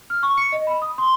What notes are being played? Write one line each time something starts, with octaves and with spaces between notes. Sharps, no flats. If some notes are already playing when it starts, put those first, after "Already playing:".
F6
C#6
C#7
D#5
B5
D#6
C6